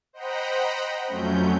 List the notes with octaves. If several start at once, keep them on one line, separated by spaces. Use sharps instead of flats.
C5 D#5 F#5 G5 A#5 B5
F2 F#3 A3 C#4 G6